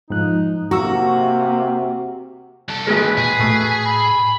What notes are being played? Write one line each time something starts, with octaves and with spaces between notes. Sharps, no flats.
G#2 F3 D#4 F#6
C3 A#3 F#4 A#5 C#6 E6
C2 A4
G#1 A#2 G#3 B4
A#2 G#4
A2 A3 C#6
B5